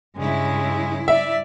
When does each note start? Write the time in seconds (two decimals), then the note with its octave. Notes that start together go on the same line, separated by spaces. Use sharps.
0.17 G2 C#3 G#3 E4
1.08 D5 E5